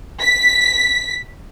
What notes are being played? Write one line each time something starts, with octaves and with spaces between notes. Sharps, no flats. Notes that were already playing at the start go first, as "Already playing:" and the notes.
B6